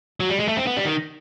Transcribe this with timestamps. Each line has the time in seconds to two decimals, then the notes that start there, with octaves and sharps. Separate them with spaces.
0.20 F#3
0.29 G3
0.40 G#3
0.48 A3
0.57 C4
0.67 B3
0.77 G3
0.85 D#3